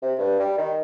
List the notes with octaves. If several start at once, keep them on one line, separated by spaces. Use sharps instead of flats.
C3
G2
G3
D#3